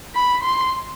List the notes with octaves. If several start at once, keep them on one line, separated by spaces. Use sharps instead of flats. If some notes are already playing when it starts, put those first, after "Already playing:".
B5
C6